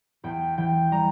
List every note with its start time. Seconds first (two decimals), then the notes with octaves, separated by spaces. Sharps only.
0.24 E2 G5
0.57 E3 G5
0.91 G3 A#5